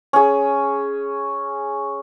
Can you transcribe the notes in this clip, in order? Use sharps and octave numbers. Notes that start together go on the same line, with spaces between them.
C#4 G#4